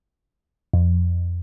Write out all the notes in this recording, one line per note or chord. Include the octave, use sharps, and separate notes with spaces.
F2